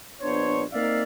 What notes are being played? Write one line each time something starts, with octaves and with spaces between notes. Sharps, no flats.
A#1 B3 D4 C5 C#5
A#3 C4 D#4 D5 E5 F5